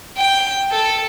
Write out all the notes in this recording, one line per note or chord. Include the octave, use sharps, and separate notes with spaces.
G5
A4